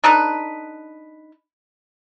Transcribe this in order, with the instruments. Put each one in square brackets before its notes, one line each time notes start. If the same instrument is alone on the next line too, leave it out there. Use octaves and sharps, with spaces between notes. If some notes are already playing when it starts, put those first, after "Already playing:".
[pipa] D4 D#4 A4 B4